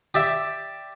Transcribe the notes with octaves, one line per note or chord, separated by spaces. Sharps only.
G4 D5 E5